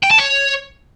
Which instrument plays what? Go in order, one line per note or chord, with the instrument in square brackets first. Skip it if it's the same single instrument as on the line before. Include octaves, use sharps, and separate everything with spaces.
[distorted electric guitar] G5
A5
C#5